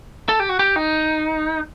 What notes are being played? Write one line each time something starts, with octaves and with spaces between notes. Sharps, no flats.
A4
G4
F#4
G4
D#4